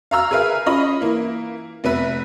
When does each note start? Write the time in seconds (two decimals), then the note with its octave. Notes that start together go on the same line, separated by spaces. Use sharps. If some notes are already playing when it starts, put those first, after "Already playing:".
0.11 F5 A#5 E6 F6
0.31 G#4 A#4 B4 E5 F5
0.66 C#4 F4 D#5 B5
1.01 E3 A#3 E4
1.84 F1 B3 B4 E5